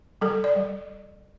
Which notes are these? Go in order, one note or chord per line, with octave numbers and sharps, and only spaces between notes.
G3 A4
D5
G3